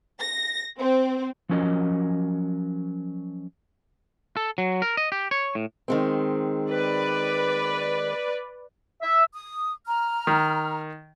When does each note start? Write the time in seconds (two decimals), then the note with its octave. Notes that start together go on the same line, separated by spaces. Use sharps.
0.20 A#6
0.78 C4
1.49 F3 F#3 C#4 A#4 D#5
4.37 A4
4.58 F#3
4.82 A#4
4.97 D#5
5.12 G4
5.31 C#5
5.55 A2
5.88 D#3 G#3 C4
6.69 B4 D5
9.02 E5
9.33 D#6
9.86 A#5 F6
10.27 D#3